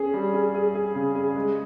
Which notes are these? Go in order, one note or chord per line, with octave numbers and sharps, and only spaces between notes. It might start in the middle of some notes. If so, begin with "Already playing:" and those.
Already playing: C#4 G#4
G3
G#4
G#4
G#4
C#3
G#4
G#3